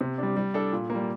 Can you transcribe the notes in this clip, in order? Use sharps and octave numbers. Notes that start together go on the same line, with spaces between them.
C3
G3 D4
G3
D4 A4
A#2
A#3
G3